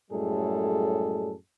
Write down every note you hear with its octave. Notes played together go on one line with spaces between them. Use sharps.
F#2 A2 G3 G#3 G#4 A4